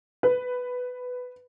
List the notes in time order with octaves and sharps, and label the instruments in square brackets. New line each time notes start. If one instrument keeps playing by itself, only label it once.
[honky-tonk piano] B4